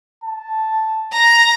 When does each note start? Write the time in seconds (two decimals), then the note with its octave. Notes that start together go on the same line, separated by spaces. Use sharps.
0.24 A5
1.13 A#5